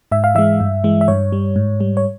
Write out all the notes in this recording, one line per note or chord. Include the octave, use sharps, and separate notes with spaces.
G#2 E5
F5
E3 G#3 E5
G2
E3 G#3
E5
G2 C#5
G3
G#2
G3
C#5